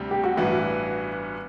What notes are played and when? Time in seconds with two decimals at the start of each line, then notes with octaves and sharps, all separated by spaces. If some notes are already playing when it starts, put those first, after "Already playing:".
Already playing: D2 C3 G3
0.11 G4
0.24 F#4
0.37 A1 G2 E3 B3 E4 F#4